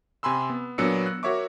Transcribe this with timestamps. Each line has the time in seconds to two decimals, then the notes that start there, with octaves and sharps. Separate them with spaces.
0.23 C3 G#5 B5 C6 E6
0.50 B3
0.78 A#2 F#3 B3 D4 E6 C#7
1.06 F#6
1.23 F#4 A#4 C#5 E5 C#6 D6